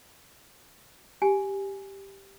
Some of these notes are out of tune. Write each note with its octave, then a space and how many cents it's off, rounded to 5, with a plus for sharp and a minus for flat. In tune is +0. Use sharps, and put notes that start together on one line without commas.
G4 +0 G#5 +0